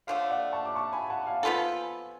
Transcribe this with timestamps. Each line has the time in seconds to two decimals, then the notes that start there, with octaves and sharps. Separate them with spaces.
0.07 D3 F3 A3 C#5 F5
0.30 D5 F#5
0.53 A5 C#6
0.65 D6
0.75 A5 C#6
0.93 G#5 B5
1.10 F#5 A5
1.26 F5 G#5
1.43 F3 B3 F4 A4 G#5 B5